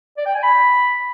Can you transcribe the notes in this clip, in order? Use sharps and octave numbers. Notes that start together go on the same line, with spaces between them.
D5
G5
G#5
B5